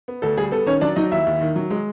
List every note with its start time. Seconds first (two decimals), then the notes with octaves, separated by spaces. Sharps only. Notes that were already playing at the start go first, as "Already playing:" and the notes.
0.08 B3
0.22 D2 A4
0.37 G3 G#4
0.52 B3 A4
0.66 D#3 C#4 C#5
0.81 F#3 D4 D5
0.96 F#3 D#4 D#5
1.11 D#2 E4 E5
1.27 D#2
1.41 D#3
1.56 F#3
1.70 G#3